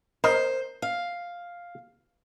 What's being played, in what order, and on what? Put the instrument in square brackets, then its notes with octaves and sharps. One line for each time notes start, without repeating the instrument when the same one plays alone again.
[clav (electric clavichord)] A#4 D#5 [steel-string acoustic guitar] C5
[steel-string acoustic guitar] F5